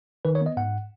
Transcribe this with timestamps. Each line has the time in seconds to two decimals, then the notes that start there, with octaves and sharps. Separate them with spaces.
0.25 D#3 B4
0.35 C#5
0.41 B3 D#5
0.57 G#2 F#5